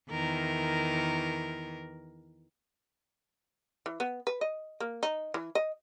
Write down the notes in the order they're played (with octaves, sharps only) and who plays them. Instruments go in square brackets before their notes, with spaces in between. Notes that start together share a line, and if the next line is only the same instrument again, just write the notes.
[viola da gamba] E2 D#3 A#4
[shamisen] E3
B3
B4
D#5
A#3
D#4
E3
D#5